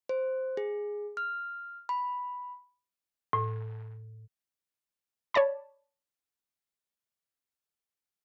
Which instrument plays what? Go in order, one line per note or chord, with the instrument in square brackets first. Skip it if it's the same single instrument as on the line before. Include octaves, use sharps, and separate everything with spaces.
[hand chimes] C5
G#4
F6
B5
[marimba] A2
[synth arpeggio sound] C#5 D5 A5 B5